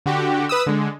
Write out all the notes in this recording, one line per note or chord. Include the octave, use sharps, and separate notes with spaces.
D3 F#4 G4
B4 D#6 E6
D3 G#3